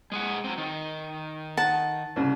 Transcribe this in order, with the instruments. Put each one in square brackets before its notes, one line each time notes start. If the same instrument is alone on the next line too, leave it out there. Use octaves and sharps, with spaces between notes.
[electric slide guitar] G#3 G#4 F#5
F#3 C4
D#3
[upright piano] F#5 [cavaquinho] A5
[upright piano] C2 C#3